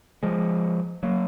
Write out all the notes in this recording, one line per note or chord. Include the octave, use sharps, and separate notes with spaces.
F3 G#3
F#3 A#3